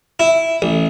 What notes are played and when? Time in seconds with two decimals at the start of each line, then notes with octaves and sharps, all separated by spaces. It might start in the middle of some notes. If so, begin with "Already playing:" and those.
0.20 E4
0.62 A1